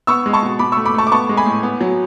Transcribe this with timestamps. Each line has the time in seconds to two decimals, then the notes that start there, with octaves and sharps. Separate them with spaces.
0.07 B3 C#6 E6
0.26 G#3
0.33 A5 C#6
0.43 B2
0.59 B2 B5 D6
0.72 A3 C#6 E6
0.86 B5 D6
0.94 A3 A5 C#6
1.07 D6
1.12 B3 A5 C#6
1.29 G#3
1.37 G#5 B5
1.46 A2
1.63 B3
1.81 F#3